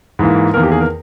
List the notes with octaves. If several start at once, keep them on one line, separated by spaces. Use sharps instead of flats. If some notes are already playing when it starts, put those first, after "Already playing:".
G#2 E3 A#3
E2 D#3 A#3 A#4
G4
G#4
A#4